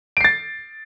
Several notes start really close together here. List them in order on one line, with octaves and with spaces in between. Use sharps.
D7 C7 A6